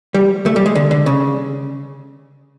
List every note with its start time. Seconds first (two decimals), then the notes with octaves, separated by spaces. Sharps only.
0.14 G3
0.46 A3
0.56 G3
0.66 G#3
0.75 D3
0.91 D3
1.06 C#3